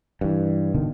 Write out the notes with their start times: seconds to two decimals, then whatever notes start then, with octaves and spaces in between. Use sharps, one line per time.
0.21 G2 E3
0.74 B2 D3 D#3